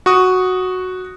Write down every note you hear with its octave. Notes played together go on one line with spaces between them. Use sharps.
F#4 C#6 D#6